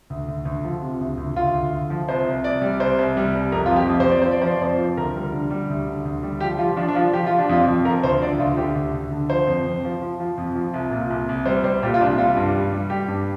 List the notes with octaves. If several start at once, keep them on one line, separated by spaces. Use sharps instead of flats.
D2
D2
D2
F3
C3
D2
D2
D2 F4
D2
D2
F3
C2 C5
C2
C2 D5
G3
C2 C5
C2
G3
C2
F2 A#4
F4
F2
G4
F2
C5
F2 D5
F3 C5
D5
F3 C5
D5
F2 C5
F3
D2 A#4
G3
D3
G3
D2
D3
D2
G3
F3 G4
F3 F4
F3 D4
D4
F3 F4
F3 G4
F3 F4
D4
F2 F4
F2
F3 A#4
D2 C5
D3 D5
D2 F4
D3 G4
D2
D2
D3
F3 C5
F2
F2
F3
F3
F3
F2
F3
C2
A#2
C2
C2
G3 C5
G3 C5
A#2 G4
F4
C2 D4
G3 F4
G2
G3
G3
G3 G4
G2